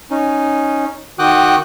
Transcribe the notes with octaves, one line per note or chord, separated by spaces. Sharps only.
C#4 D#4
D#3 F#4 G5 D6 D#6 F#6